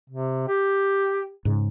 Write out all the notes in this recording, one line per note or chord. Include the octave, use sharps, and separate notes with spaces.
C3
G4
G#2 C#3